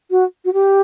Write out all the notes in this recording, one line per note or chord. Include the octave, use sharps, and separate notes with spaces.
F#4
F#4
G4